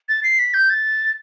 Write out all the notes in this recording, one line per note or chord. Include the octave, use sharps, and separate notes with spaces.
A6
C7
B6
G6
A6